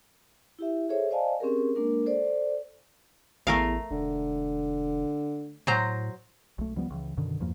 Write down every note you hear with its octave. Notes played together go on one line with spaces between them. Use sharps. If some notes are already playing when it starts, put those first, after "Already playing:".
E4 G4 E5
G#4 A4 C5 C#5 E5
C5 D5 D#5 F5 G#5 A5
C4 C#4 G4 G#4 A#4
G#3 A#3 D4 A#4
A4 C5 D5
A1 E2 A3 A#4 F5
E1 D3
A2 F#3 C5 A#5
B1 A3
C#2 F3 G3 B3
C#2 E3
F#2 B2 D3 D#3
E2 G2 F3 A#3